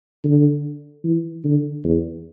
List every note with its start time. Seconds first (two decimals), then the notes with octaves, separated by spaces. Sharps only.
0.24 D3
1.04 E3
1.44 D3
1.84 E2